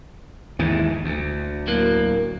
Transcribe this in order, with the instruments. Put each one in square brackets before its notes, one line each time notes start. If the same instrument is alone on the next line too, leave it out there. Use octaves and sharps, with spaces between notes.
[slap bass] D#2 G#2 E3
D2
[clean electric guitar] A2 F#3 A#3